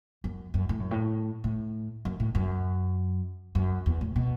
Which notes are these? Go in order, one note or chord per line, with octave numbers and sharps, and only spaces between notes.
F#2
F#2
A2
F#2
A2
A2
F#2
A2
F#2
F#2
E2
A2
B2